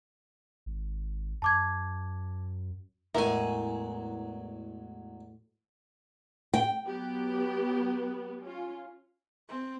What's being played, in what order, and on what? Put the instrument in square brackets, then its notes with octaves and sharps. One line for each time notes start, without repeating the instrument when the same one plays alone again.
[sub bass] G#1
[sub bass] F#2 [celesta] A5 D6 G#6
[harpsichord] E2 F#3 G#3 [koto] A2 G#5 [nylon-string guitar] A#4 [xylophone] E5
[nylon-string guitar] G5
[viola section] F#3 B3 G4
C#4 F4
[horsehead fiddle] C4